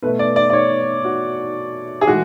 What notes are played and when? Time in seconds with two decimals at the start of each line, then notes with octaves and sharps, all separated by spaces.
0.02 B2 A3 B4
0.19 D5
0.36 D5
0.50 D5
0.53 C#5
1.05 F#4
2.01 G#4
2.07 A2 E3 G#3 F#4